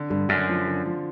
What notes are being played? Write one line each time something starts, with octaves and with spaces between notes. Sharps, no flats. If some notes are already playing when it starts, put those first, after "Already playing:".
Already playing: D3
G2 D3
F#2 D3
F3
D3
F3